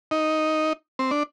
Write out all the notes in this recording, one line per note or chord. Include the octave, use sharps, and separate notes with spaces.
D#4
C4
D4